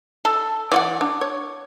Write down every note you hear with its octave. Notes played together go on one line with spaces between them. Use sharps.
A4
E3 F4 D5 F#5
D4
C#5